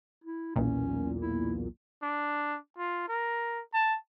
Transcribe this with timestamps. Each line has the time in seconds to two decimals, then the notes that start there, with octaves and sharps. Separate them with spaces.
0.24 E4
0.56 B1 E2 A#2 C#4
1.21 E4
2.03 D4
2.78 F4
3.08 A#4
3.74 A5